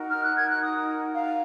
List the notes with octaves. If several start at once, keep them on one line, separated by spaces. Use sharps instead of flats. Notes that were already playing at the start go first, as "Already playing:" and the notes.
Already playing: D#4 F#4 A#4
F6
F#6
G#6
F#6
D#6
F5